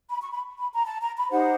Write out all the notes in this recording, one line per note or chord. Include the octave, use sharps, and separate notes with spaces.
B5
C#6
B5
B5
A#5
A5
A#5
B5
D#4 G4 C5 F#5